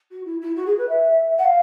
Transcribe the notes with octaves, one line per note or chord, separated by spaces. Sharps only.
F#4
E4
E4
F#4
G#4
B4
E5
F#5
F5